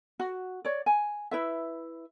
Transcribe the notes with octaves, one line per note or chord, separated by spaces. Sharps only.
F#4
C#5 D5
G#5
E4 B4 E5